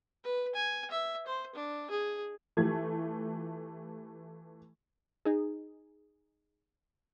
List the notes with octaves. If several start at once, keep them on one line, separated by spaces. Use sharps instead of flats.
B4
G#5
E5
C5
D4
G#4
E3 A3 F4 G4 G#6
D#4 G#4